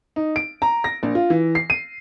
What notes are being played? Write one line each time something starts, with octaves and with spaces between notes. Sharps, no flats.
D#4
D7
A#5
A#6
A#1
F4
E3
C7
D#7